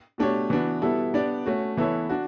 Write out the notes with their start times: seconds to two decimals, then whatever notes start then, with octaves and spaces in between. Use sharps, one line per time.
0.18 B2 A3 D4 G4 C#5
0.50 E3 B3 D4 F#4
0.82 B2 G3 B3 E4 A4
1.14 B3 D4 G4 D5
1.46 A3 C#4 F#4
1.77 E3 B3 E4 A4 C#5
2.10 D4 F#4